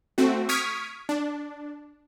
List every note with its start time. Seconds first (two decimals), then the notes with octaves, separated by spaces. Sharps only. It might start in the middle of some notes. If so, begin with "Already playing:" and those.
0.18 A3 C4 F#4
0.49 C#6 D#6 F6 G#6 B6 D7
1.09 D4